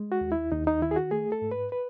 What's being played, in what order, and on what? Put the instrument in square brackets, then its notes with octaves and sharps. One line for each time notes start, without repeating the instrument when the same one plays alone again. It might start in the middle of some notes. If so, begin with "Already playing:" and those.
Already playing: [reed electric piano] G#3
F#4
D#2
E4
D#2 D#4
D#4
D#3 E4
G#4
F#4
A3 G#4
A4
G#2
B4
B4